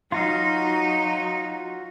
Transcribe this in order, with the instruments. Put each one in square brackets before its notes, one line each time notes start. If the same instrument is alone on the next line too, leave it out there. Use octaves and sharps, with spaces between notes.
[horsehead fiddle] F#3 [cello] D#4 [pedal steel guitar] F4 F#4 F5